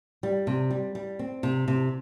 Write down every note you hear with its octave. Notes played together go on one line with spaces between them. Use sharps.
G3
C3
G3
G3
C4
C3
C3